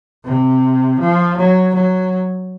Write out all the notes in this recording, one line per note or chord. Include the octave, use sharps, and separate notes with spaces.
C3
F3
F#3
F#3